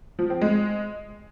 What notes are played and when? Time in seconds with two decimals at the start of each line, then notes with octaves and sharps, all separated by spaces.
0.19 F3
0.30 C4
0.41 G#3